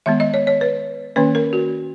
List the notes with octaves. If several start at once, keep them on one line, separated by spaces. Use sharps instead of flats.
D#3 G#3 B3 E5
D#5
C#5
C#5
B4
D#3 A#3 C#4 B4
A#4
F#4